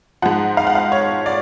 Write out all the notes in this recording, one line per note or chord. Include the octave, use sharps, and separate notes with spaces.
G#2 F3 F#5
F5
F#5
F5
C#5
D5